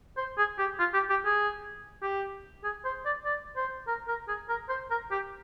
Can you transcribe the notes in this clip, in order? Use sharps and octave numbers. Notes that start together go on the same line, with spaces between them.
C5
G#4
G4
F4
G4
G4
G#4
G4
G#4
C5
D5
D5
C5
A#4
A#4
G#4
A#4
C5
A#4
G4